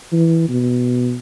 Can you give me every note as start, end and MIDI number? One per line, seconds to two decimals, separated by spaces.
0.12 0.44 52
0.49 1.16 47